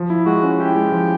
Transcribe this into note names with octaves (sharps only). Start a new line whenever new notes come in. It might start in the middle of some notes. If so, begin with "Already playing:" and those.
Already playing: F3
E4
G#3 F#4
C#4
E4 G4
G#3
F3